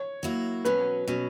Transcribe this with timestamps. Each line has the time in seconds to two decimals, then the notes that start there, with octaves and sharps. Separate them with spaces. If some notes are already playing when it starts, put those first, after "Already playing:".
Already playing: C#5
0.23 F#3 A#3 E4
0.65 B2 F#3 C#4 B4
1.08 B2 F#3 C#4